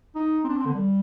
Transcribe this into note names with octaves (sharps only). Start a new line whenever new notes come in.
D#4
C4
D4
C4
D3
G3